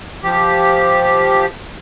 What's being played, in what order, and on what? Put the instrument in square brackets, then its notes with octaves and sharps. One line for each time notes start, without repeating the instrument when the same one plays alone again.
[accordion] F3 G4